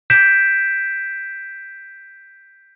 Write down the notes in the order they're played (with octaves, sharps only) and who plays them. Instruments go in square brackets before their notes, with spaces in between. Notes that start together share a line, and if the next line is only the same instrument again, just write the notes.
[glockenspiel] G6 B6 D7 E7